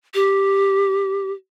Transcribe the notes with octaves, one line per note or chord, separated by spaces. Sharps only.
G4